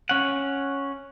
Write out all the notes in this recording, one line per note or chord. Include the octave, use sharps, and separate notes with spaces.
C#4 F#5